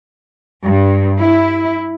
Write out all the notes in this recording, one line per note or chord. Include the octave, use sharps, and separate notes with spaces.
G2
E4